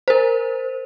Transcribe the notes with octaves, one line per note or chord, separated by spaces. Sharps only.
A#4 C5